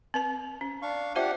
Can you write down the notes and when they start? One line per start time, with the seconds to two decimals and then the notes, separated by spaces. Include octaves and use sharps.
0.14 C4 B4 A5
0.61 C#4
0.82 D4 F5 C#6
1.15 D4 F4 G4 C5 E5 F#5